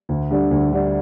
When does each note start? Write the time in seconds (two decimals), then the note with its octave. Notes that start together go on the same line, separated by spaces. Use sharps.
0.09 D2
0.31 D3 G3 D4
0.51 D2
0.71 D3 G3 D4